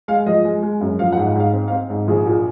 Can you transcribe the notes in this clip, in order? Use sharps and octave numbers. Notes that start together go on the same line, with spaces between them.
G#3 F5
F3 D#5
G#3
G#3
F#2
F3 F5
F#5
G#2
F#5
G#2 F5
C4
F5
C4
G#2
A#1 G#4
A#2